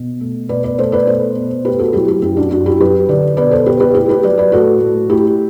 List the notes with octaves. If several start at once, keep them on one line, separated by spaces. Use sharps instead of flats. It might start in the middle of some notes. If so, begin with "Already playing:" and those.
Already playing: B2
A3
B2 B4 D5
B4 D5
A3 A4 C5
B4 D5
B2 A4 C5
B2
A3 G4 B4
F#4 A4
F#3 E4 G4
E4 G4
F#2 E4 G4
D4 F#4
F#2 D4 F#4
E4 G4
F#3 G4 B4
D3 B4 D5
B2 B4 D5
A4 C5
B2 G4 B4
G4 B4
A3 E4 G4
G4 B4
F#3 B4 D5
B4 D5
A2 F#4 A4
A2
A3 E4 G4